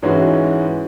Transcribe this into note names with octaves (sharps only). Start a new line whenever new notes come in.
G#2 E3 G#3 C#4 F#4